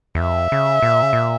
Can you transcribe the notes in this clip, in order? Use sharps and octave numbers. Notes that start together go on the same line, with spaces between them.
E2
F2 E5
C#3
A#2
C#3
A#2